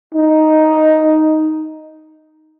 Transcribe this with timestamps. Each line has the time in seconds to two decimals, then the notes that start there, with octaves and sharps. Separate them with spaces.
0.15 D#4